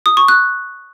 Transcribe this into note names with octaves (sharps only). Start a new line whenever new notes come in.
D#6
C#6
F#6